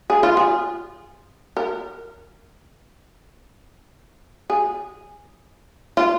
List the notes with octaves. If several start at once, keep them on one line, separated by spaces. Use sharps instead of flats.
G#4
F4
G#4
A#4
G#4
F4